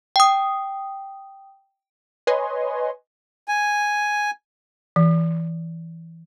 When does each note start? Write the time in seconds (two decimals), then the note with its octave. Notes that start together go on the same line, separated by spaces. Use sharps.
0.16 G5 D#6
2.27 B4 C#5 D#5 G#5 C6
3.48 G#5
4.96 E3